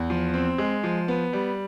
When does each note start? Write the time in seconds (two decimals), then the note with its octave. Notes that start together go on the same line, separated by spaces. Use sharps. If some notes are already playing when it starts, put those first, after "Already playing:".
Already playing: E2
0.10 F3
0.34 C4
0.58 G#3
0.83 F3
1.08 B3
1.33 G3